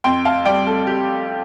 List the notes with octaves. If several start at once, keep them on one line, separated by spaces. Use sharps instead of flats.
F2 G5 C6
F5 A5
G3 D5 G5
A4
G4